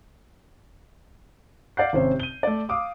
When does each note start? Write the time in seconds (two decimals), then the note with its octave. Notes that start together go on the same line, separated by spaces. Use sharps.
1.77 D5 F5 F#5 G6 C7
1.93 G#1 C3 C4 C#4 C5
2.20 D#7 G7
2.43 A3 D5
2.69 F5 D6 D#6